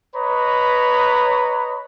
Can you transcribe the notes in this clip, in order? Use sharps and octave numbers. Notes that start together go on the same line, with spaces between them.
B4 C#5 D#5 A#5 B5